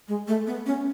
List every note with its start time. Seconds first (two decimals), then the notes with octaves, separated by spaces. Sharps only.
0.08 G#3
0.28 A3
0.47 B3
0.66 C#4